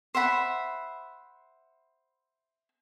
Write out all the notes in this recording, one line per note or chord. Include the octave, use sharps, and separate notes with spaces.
C5 E5 F#5 B5